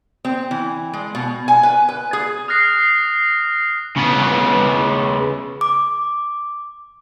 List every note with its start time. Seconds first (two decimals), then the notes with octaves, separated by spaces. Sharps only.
0.25 C4
0.51 E3
0.94 G#3
1.15 B2
1.48 G#5
1.63 B4
1.89 B4
2.13 G#4
2.48 D#6 F6 F#6 A#6 C7
3.97 C#3 B3
5.61 D6